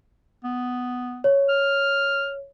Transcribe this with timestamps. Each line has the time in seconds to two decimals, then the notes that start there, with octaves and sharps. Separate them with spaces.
0.44 B3
1.24 C#5
1.49 F6